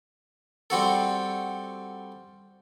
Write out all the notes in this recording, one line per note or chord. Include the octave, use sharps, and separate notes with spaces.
G3 C4 F#4 A4